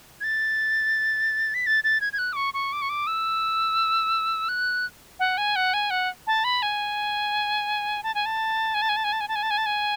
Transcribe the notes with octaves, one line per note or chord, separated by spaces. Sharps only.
G#6
A6
B6
A6
A6
G#6
G#6
F#6
D6
C#6
C#6
D6
C#6
D6
E6
F#6
F#5
G#5
F#5
G#5
F#5
A5
B5
G#5
A5
G#5
A5
G#5
A5
G#5
A5
G#5
A5
G#5
A5
G#5
A5
G#5
A5
G#5